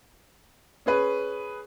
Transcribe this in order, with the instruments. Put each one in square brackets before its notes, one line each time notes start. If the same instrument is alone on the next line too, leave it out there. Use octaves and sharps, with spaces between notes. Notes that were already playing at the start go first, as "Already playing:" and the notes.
[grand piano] C#4 G#4 B4